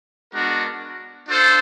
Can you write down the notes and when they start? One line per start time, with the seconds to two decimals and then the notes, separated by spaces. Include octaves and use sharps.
0.34 G#3 B3 D4 F#4 A#4
1.28 D4 F4 A4 C5